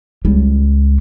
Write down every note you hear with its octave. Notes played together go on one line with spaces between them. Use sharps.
C#2 G3